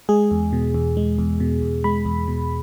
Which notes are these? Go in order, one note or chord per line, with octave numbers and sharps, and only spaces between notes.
G#3 G#4
E2
B2
E2
G#3
E2
B2
E2
G#3 B5
E2
B2